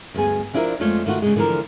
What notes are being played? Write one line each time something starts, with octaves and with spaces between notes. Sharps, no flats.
D2 G2 B3 G#4 G#5
F3 D4 E4 F4 A4 A#4
F2 G#3 A3 F4 C#5 D5
D#3 A3 F4 F#4
C#3 G#3
D3 E3 F3 F4 A#4